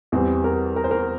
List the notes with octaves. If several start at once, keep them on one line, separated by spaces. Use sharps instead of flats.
E2 E3 G3 C4
A#4
A#4
C5
A#4